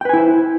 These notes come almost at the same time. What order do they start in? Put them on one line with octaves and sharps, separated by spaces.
G5 B4 G#5 E4 C5